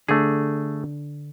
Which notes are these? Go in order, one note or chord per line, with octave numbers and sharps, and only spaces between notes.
D3 A3 G#4